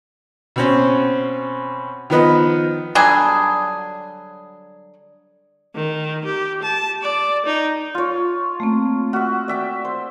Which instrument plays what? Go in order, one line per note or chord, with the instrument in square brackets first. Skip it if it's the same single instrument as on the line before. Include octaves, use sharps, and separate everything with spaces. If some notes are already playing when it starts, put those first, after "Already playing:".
[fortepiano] B2 C4 C#4
D#3 F3 B3 B4 D#5
[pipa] D3 F#3 G3 G#4
[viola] D#3
G4
A5
D5
D#4
[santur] F4 C#5
[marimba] A3 A#3 C4
[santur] F#4 E5 [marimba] F6
[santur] D5 E5 G5
C5